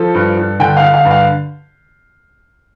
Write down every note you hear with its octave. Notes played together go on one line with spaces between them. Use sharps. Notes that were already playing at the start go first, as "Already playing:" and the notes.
Already playing: F3 A4
G2
G2
D3 G5
F5
D3
F5
G2
F5